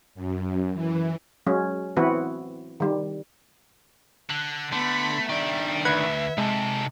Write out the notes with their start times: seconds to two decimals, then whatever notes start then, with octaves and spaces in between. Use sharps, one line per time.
0.15 F#2
0.74 E3
1.47 F#3 G#3 C#4
1.97 E3 B3 C4 E4 F#4 B4
2.80 D#3 G3
4.30 D3 F#6
4.72 D3 A3 B3 B5
5.29 D#3 D4 D5 E5 G5
5.85 D2 B4 E5 F#5 G#6
6.38 C3 G#3 D#4 A4